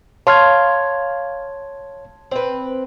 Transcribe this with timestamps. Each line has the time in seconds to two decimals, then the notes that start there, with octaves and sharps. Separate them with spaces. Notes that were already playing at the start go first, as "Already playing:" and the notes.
0.27 C#5 F5 A5 C6 F6 G#6
2.31 C4 B4